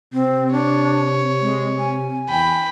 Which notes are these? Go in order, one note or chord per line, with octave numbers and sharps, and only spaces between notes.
C3 C4
D4 C#5
G#3
G#5
E2 G5 B5